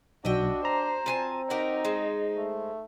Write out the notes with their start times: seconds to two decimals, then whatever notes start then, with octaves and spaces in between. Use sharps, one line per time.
0.25 B1 D4 F#4 D#5 E5 G5
0.65 C5 A#5
1.06 C4 F4 G#5 A5
1.50 D#4 F#4 G4 A#4
1.85 G#3 C5
2.36 A3